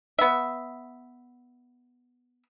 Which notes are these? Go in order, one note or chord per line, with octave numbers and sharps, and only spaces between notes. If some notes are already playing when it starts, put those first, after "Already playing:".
B3 E5